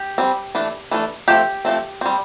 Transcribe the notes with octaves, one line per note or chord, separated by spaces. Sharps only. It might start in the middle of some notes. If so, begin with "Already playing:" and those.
Already playing: G4
G3 C4
E3 A3 D4
E3 A3 D4
F3 A3 C4 G4
F3 A3 C4
G3 C4